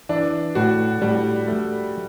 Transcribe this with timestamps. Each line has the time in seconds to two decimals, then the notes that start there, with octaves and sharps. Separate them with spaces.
0.09 E3 D4
0.55 A2 F#4
1.02 A2 G3
1.48 A3